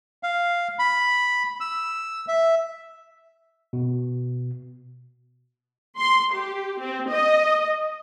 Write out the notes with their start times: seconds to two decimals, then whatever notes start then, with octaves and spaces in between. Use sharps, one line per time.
0.23 F5
0.79 B5
1.60 E6
2.28 E5
3.73 B2
5.98 C6
6.35 G4
6.79 C4
7.11 D#5